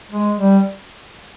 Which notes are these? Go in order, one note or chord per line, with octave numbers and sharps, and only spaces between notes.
G#3
G3